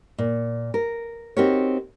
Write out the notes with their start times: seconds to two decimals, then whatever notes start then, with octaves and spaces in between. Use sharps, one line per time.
0.18 A#2
0.74 A#4
1.37 C4 D#4 F#4 G4 A#4 C#5